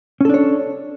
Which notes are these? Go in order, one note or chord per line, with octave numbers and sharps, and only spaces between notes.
C#4 D4 A4 C#5